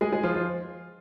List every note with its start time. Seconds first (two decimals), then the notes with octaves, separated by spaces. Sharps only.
0.01 G#3 G#4
0.12 G#3 G#4
0.23 F3 F4
0.34 F3 F4